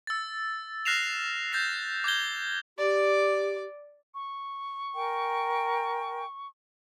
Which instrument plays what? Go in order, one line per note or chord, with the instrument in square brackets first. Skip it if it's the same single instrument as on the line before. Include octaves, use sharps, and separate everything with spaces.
[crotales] E6 A6
F6 F#6 A#6 C7 E7 F7
G6 A6 A#6 C7
D6 G6 G#6 G7
[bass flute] G4 [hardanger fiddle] D5 D6
[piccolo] C#6
[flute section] A#4 G5 G#5